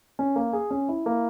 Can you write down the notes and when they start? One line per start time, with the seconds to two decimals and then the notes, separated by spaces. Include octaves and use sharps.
0.19 C#4
0.36 A#3
0.53 G#4
0.71 C#4
0.89 E4
1.06 A#3